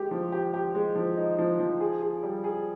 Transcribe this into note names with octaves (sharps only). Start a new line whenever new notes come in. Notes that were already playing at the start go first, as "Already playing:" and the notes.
Already playing: G#3 G4
F3
G4
G4
G#3
F3
D#4
F3
F3
G#4
G#4
G3
G#4